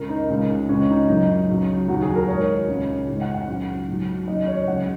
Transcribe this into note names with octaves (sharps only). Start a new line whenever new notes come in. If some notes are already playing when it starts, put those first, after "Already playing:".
Already playing: C#2 C#3 G#3 A#4
D#4
C#2 C#3 G#3
C#2 C#3 G#3 C#4
D#4
F#2 C#3 F#3 D#4
C#2 C#3 F#3
D#2 D#3 F#3 F#4
G#4
A#4
G#2 D#3 G#3 C#5
C#2 C#3 G#3
G#2 G#3
F#5
F#5
C#2 C#3 F#3
G#2 F#3
D#2 C#3 F#3 D#5
C#5
C#2 C#3 F#3 F#5